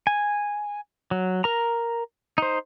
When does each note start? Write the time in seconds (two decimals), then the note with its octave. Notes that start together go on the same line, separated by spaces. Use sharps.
0.07 G#5
1.11 F#3
1.44 A#4 A#5
2.38 D#4 C5